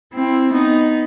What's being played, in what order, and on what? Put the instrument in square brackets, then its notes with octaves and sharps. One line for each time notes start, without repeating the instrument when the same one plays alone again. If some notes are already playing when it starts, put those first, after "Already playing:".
[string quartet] C4 E4
B3 D#4